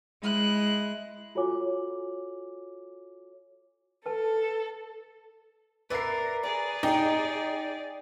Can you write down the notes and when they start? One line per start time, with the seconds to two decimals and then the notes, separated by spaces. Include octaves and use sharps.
0.20 G#3 E4 F#6
1.35 F4 F#4 A4 C#5 G#5 D6
4.06 A4 B4 A5
5.90 A#4 B4 D5 E5 C7
6.43 G#4 D5 A#5
6.83 D#4 G4